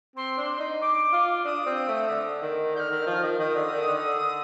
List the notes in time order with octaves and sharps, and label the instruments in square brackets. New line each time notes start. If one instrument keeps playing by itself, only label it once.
[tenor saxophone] C4 [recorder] C6
[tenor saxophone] D4
D#4
[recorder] D6
[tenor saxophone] F4
[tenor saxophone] D4 [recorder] D#6
[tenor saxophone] C4
A3
D3
D#3
[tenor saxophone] D3 [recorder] F6 G6
[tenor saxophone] D#3
F3
D#3
[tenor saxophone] D#3 [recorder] D#6
[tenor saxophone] D3
D#3
D3